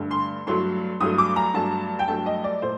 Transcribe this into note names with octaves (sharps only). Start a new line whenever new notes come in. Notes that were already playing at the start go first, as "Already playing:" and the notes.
Already playing: G2 D3 A3
C6
G2 F#3 A3 C6
G2 F#3 A3 D#6
D6
A#5
G2 F#3 A3 A5
G5
G2 F#3 A3 A5
D#5
D5
A#2 A3 C5